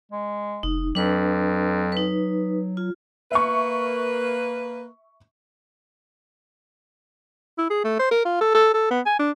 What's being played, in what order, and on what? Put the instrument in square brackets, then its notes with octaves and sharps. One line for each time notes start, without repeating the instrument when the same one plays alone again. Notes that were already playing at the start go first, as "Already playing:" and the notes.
[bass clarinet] G#3
[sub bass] F1 [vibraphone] D#4
[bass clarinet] F2 [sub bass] F#3 [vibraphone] D4 B4
[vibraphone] D#4 B4
F4
[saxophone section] A#3 B4 [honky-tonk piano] E5 C#6
[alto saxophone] E4
G#4
A3
C5
A#4
F4
A4
A4
A4
B3
G#5
D4